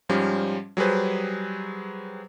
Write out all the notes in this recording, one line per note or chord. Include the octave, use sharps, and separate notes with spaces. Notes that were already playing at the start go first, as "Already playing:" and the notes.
G#2 F3 G3 C#4
F#3 G3 G#4 B4 C5